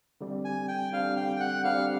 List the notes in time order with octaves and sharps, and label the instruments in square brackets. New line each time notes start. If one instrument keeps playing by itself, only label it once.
[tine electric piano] D3 G3 C4
[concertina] G#5
G5
[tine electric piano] D3 G3 C4 [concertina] F5
[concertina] G5
G5
F#5
[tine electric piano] D3 G3 C4 [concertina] F5